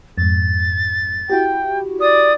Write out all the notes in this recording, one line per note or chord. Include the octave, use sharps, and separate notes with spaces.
F2 G#2 A6
E4 F#4 G4 G5
D5 D#6